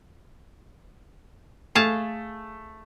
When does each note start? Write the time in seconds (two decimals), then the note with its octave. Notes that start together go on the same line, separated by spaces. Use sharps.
1.75 A3 G#4 F5 A5